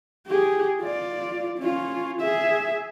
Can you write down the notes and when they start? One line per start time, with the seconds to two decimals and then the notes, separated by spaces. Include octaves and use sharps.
0.27 G4 G#4
0.81 F4 D5
1.59 C#4 F4
2.22 G#4 E5